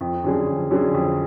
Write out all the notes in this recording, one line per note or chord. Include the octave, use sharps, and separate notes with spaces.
F2
D3 F#3 C#4 G#4
F2
D3 F#3 C#4 G#4
F2